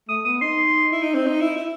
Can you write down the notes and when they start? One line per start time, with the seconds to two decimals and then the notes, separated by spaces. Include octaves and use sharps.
0.08 A3 D#6
0.25 B3 D#6
0.41 D#4 C6
0.92 E4
1.03 D#4
1.15 C4
1.27 D#4
1.41 E4
1.57 E4